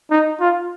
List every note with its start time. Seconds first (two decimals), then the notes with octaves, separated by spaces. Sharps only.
0.11 D#4
0.40 F4